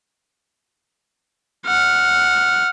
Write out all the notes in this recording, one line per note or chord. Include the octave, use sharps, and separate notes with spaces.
F#5 F6